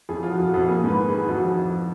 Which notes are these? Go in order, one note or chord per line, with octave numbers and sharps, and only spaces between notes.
F2 G#4
F3 F4
F#4
F2
F#4
F2
A#3 G#4
G#2 B4
D#3
G#4
D#3
F2 F#4
F3
F2